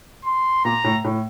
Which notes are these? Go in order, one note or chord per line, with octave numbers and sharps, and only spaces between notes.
C6
A#2 A#5
A2
A2